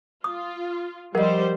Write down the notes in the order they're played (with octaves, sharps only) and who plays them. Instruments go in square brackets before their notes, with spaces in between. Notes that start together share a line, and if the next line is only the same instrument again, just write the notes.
[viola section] F4 [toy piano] D#6
[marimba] F3 D#5 [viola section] G3 C5 [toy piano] A#4 F#5